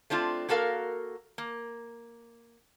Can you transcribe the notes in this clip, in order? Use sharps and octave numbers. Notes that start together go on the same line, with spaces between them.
A3 C4 D4 F4
A#3 F#4 A4 A#4 F5
A#3